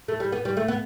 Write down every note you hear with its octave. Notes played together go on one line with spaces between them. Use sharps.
A3
G3
B3
G3
A3
B3